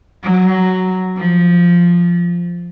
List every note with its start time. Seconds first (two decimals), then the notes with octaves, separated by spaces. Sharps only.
0.24 F#3
1.17 F3